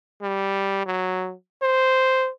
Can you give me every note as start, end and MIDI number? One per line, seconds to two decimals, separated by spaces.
0.22 0.83 55
0.86 1.34 54
1.62 2.29 72